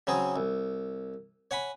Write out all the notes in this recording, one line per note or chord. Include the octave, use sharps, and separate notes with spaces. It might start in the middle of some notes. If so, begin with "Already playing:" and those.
C#3 F#3 C4 G#4
C2
C#5 F#5 G#5 B5